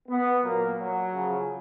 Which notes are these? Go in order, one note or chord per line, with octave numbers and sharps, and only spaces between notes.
B3
A#2 F#3 A#3
F#3
C#3 F3